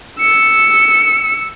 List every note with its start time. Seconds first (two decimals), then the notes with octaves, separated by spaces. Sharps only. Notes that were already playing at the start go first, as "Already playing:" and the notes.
0.20 E6 C#7